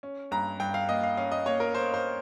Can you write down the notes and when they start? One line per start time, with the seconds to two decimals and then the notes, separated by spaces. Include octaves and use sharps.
0.03 C#4
0.31 G2 A#5
0.60 G2 G5
0.74 F5
0.89 A#3 D#5
1.03 F5
1.17 C#4 F5
1.32 D#5
1.46 A#3 C#5
1.60 A#4
1.75 C#4 C5
1.94 C5